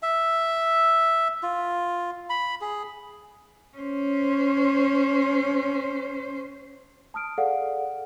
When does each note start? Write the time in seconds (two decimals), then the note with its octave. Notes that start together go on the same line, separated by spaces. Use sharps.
0.02 E5
1.43 F4
2.30 B5
2.61 G#4
3.77 C#4 C5
7.14 A5 D#6 F6 D7
7.38 G#4 A4 D5 F5 F#5